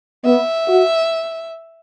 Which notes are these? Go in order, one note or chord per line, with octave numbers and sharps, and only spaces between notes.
B3 E5
F#4